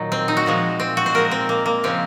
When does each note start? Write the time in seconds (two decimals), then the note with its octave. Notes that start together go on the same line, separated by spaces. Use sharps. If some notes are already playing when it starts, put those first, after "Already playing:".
Already playing: A#2 D#3 F#3 D#4
0.12 C4
0.28 D#4
0.37 F#4
0.46 A#2 F3 G#3
0.80 C4
0.97 F#4
1.06 C5
1.14 A#2 F3 G#3 A#4
1.31 C4
1.49 A#3
1.66 A#3
1.83 C#3 F3 G#3 C4